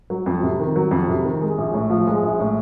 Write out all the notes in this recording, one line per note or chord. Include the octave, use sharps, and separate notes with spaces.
F#3
F2
C3
D#3
F#3
F2
C3
D#3
G#3
A#1
A2
F3
G#3
A#1
A2